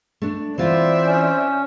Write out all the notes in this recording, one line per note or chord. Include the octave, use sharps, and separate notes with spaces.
A3 D4
E3 C4 F4 C5 D5 E5
C#4